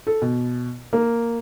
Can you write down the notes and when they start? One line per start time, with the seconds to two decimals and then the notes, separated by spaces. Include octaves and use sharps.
0.07 A4
0.22 B2
0.93 A#3